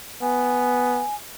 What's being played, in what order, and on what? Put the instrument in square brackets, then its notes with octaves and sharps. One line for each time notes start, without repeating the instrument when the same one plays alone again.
[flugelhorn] B3 [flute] G#5